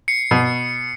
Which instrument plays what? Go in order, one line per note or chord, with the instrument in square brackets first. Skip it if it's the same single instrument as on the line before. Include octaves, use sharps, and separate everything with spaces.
[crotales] C7 C#7
[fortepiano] B2